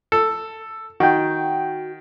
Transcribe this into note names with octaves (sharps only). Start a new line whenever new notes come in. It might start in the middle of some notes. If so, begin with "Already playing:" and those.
A4
D#3 F#4 G5